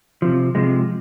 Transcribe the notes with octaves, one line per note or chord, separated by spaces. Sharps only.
C3 F3
C3 F3 G#3